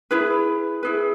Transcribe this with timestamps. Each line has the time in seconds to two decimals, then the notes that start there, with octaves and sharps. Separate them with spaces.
0.11 E4 G#4 B4
0.83 E4 G#4 B4